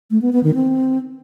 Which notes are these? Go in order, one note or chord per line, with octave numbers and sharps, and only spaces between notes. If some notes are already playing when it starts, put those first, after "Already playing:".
A3
B3
B3
D#3
C4